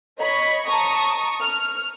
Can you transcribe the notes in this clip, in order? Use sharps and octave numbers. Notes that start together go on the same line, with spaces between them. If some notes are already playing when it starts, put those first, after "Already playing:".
C#5 D#5 B5 C#6
A5 A#5 C#6 D#6
F6